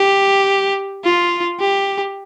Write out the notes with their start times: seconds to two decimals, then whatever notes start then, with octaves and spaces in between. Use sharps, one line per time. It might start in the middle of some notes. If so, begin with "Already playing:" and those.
Already playing: G4
1.04 F4
1.60 G4